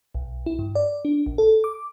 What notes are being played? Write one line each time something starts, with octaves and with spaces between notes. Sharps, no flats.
B1
E4
G2
D5
D4
A#1
A4
D6